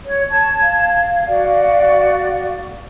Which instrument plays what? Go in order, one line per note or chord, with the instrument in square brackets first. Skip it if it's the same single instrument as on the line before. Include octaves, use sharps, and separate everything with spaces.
[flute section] C#5
A5 G#6
[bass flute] F5
[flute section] F#4 D5